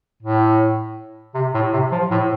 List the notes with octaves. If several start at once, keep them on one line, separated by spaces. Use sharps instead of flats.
A2
C3
A2
C3
F3
A2